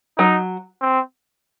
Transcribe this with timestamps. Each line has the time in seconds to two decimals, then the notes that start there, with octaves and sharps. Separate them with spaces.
0.18 F#3 D#4
0.81 C4